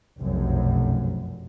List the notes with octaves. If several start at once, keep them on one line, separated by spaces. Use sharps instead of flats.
F1 B1 F#2